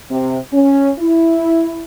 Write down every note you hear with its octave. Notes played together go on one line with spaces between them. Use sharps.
C3
C#4
E4